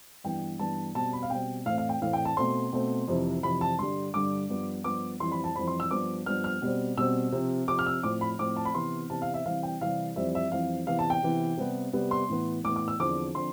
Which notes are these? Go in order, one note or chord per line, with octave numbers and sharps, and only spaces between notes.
G2 E3 B3 G5
G2 E3 B3 A5
B2 G3 C4 A5
B5
F5
B2 G3 C4 G5
A2 E3 A3 C4 F5
F5
G5
A2 E3 A3 C4 F5
G5
A5
B2 A3 C4 C6
B2 A3 C4
F2 C3 E3
F2 C3 E3 B5
A5
G2 D3 G3 C6
G2 D3 G3 D6
G2 F3 B3
G2 F3 B3 D6
F2 E3 G3 C4 C6
B5
A5
F2 E3 G3 C4 B5
C6
E6
G2 F3 B3 D6
G2 F3 B3 F6
F6
B2 G3 C4
B2 G3 C4 E6
C3 F3 C4
C3 F3 C4 D6
F6
E6
A2 F3 C4 D6
B5
A2 F3 C4 D6
A5
B5
C3 E3 B3 C6
C3 E3 B3 A5
F5
E5
C3 E3 G3 C4 F5
G5
C3 E3 G3 C4 F5
F2 E3 G3 C4 E5
E5
F2 E3 G3 C4 F5
C3 E3 B3 F5
A5
G5
C3 E3 B3
C3 G3 B3
C3 G3 B3
C6
A2 E3 B3
A2 E3 B3 D6
D6
E6
E2 D3 F3 C4 D6
D3 F3 C4 C6